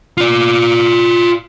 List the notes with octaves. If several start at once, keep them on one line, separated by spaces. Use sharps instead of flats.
F4 D5